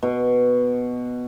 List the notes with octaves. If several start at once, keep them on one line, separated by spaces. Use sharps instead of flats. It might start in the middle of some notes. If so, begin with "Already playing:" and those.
B2